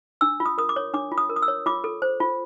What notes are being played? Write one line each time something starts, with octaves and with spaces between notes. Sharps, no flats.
D4 E6
F4
D#6
A#4 D#6
D6
C#5
D4 D6
F4
D#6
A#4
D#6
E6
C#5
F4 D6
A4
C5
F4